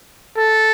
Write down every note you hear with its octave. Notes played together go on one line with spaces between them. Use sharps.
A4